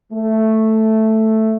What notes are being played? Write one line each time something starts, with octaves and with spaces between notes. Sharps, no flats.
A3